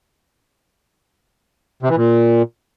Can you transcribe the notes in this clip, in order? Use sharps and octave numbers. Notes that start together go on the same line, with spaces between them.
C3
E3
A#2